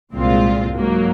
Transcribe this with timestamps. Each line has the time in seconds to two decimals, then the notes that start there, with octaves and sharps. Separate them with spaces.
0.14 C2 A#2 G#3 C4 F4
0.75 G#2 F#3 A#3